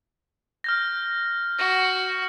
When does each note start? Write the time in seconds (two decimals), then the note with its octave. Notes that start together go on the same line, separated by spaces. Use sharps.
0.64 F6 G6 A#6
1.59 F#4 A#6